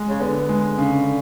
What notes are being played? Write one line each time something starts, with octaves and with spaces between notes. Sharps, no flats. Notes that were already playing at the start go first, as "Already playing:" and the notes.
Already playing: G#3
C#3
D3 B3
G#3
C#3